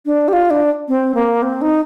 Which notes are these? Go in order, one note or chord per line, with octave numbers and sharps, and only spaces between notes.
D4
G4
F4
D4
C4
A#3
C4
D#4